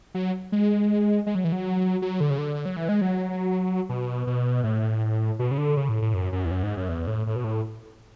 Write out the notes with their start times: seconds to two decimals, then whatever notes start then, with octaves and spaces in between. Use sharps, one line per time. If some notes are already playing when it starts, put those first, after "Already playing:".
0.14 F#3
0.52 G#3
1.26 G#3
1.35 F#3
1.44 E3
1.52 F#3
2.02 F#3
2.20 D3
2.30 C#3
2.38 D3
2.66 F#3
2.77 E3
2.89 G#3
3.01 F#3
3.89 B2
4.27 B2
4.64 A2
5.39 B2
5.51 C#3
5.58 D3
5.77 C#3
5.89 A2
6.02 A2
6.14 F#2
6.32 F#2
6.45 E2
6.51 F#2
6.63 G#2
6.77 F#2
6.89 E2
7.07 A2
7.27 A2
7.36 B2
7.44 A2